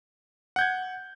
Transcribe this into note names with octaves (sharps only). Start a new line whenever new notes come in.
F#5 G6 G#6